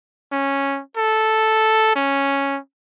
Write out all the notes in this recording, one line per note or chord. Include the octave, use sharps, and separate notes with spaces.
C#4
A4
C#4